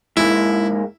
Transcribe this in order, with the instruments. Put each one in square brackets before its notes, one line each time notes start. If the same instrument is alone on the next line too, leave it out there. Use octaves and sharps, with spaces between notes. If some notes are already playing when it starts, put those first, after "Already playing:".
[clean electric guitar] G#2 G#3 A#3 [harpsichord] E4